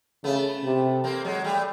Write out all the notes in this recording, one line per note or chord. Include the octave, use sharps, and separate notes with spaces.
C#3 A3 B3
C3
A#3 C4
F#3 G#3
G3 A3